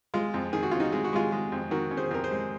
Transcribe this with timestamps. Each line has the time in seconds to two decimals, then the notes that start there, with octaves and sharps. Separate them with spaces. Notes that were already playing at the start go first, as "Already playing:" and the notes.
0.14 G#3 F4
0.34 F2
0.53 D#3 G#4
0.63 F#4
0.71 C#4 F4
0.80 D#4 F#4
0.92 G#3 G#4
1.04 F#4
1.13 G#3 F4 G#4
1.32 G#3
1.52 F2
1.71 D#3 F#4 A#4
1.91 C#4
1.97 G#4 C5
2.11 F2 A#4
2.24 G#4 C5
2.31 G#3